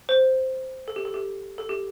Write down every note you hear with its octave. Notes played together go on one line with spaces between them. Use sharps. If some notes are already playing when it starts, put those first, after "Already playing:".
C5
A4
G4
A4
G4
A4
G4